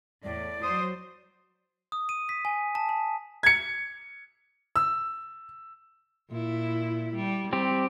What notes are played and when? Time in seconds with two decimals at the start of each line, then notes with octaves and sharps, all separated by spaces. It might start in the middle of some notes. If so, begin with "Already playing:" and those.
0.24 E2 A2 D5
0.63 F#3 C5 D#6
1.92 D#6
2.09 D#7
2.29 B6
2.45 G#5
2.75 A5
2.89 A5
3.43 G#6 C#7
4.76 E6
6.30 A#2 E4
7.16 G3
7.53 G3 C4 G4